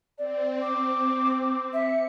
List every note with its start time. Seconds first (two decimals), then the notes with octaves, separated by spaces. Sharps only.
0.18 C4 D5
0.62 D6
1.73 E5 C#7